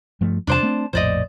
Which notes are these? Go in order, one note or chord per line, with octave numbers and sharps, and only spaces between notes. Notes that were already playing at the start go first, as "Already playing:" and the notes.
G2 F3 A3
E2 C3 D4 C5 A5
A3 C4
A#1 F2 A2 C5 D5 D#5